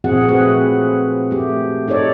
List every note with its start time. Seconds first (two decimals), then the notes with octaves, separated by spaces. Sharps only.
0.04 A#2 F3 C4 F#4 G#4 F#5
0.28 A3 C4 F#4 G#4 B4
1.31 A3 G4
1.88 D#4 G4 A4 C#5 D5